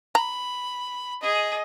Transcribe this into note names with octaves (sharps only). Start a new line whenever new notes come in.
A#5 B5
G#4 D#5